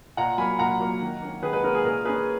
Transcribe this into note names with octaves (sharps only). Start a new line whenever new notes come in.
A#2 F#5 A#5
F#3 A#3 G#5 B5
A#2 F#5 A#5
F#3 A#3
D#3
A#3 C#4
D#3 G#4 B4
G#4 B4
A#3 C#4 A#4
G#4
A#2 A#4
A#3 C#4 G#4 B4